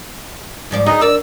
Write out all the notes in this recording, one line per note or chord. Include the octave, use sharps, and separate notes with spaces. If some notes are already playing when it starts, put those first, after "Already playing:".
G#2 F3 D5
D2 B3 D#4 G#4 D#5
A#4 D5 E6